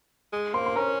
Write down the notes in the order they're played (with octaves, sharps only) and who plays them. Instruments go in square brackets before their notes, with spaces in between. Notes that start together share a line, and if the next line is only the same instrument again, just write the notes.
[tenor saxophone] G#3
[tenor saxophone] A#3 [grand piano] C5 C6
[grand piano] C6
[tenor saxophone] C#4 [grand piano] A#4 A#5